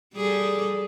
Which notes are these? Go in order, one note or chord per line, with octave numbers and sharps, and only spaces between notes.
G3 G#4 A4